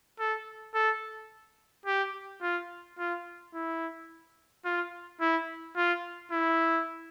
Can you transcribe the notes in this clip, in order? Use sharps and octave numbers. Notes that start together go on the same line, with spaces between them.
A4
A4
G4
F4
F4
E4
F4
E4
F4
E4